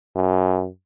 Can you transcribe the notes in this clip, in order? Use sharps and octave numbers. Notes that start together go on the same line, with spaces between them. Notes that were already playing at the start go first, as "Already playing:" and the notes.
F#2